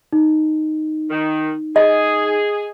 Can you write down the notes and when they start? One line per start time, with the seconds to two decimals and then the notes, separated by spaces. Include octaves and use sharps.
0.13 D#4
1.10 D#3
1.76 G#4 D#5